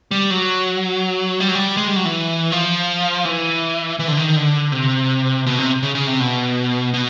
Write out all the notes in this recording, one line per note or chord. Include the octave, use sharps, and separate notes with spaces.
G3
F#3
G3
F#3
G3
G#3
G3
F#3
E3
F3
E3
E3
D3
D#3
D3
C3
B2
C3
C#3
C#3
C3
B2
B2